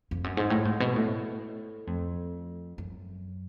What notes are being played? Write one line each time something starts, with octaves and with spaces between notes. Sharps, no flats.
F2
F#2
G#2
A2
G#2
B2
A2
F2
F#2